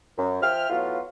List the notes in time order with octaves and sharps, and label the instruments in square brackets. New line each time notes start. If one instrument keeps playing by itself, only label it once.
[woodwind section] F#2
F3 E5 G5 F6
A2 F#3 B3 F4